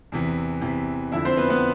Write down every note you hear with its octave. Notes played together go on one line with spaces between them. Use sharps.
E2 C3 E3
E2 C3 E3
F2 D3 F3 E4 E5
C4 C5
B3 B4
B3 B4